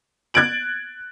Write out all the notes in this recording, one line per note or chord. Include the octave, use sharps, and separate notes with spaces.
F#6 G#6 A6 D7 F#7